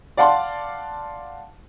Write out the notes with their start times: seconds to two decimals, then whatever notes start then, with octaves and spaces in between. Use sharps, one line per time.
0.17 D5 F5 F#5 A5 C6